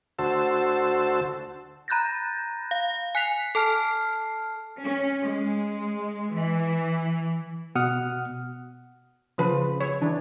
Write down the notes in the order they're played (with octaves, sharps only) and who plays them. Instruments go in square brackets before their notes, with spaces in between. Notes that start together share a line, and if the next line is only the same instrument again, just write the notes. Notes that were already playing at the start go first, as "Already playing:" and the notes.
[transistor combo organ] D2 F#4 C5 A5 E6
[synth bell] A#5 B5 F#6 G6 A6 A#6
F5
G#5 F#6 B6 C7 F7
A4 A5 F6 C7
[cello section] C#4
G#3
E3
[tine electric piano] B2 F#5 D#6 F6
[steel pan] C#3 F3 B4
C#5
E3 D4